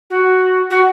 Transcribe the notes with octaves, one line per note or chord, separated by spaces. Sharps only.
F#4
F#4